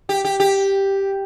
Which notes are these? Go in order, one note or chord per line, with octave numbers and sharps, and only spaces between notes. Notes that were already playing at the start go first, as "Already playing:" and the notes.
G4
G4
G4